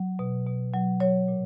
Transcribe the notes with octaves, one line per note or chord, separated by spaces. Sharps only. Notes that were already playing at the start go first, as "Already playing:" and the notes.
Already playing: F#3
B2
B2
F#3
F#3 C#5
A#2